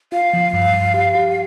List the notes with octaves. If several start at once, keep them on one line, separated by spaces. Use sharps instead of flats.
F4 F5
F3
G2
G2
G4
G4